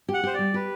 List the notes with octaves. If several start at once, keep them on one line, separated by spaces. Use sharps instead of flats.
G4
F#5
G4 C5
G3 D5
G4 B4